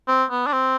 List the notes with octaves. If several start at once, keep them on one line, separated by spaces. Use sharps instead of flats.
C4
B3
D4
C4